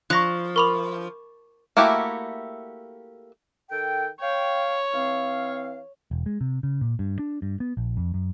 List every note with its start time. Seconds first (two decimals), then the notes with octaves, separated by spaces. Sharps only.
0.10 F3 D5 A#5 C#6 F#6 A#6
0.56 A#4 B5 C#6 D6 F7
1.77 A3 A#3 E4 F#4 G4
3.71 D#3 A4 G5
4.20 C#5 F5 G5
4.93 E3 C4 F5
6.11 E1
6.26 G#3
6.41 C3
6.63 C#3
6.81 A#2
6.99 G2
7.19 D4
7.42 G2
7.60 B3
7.77 A#1
7.97 F2
8.14 F#2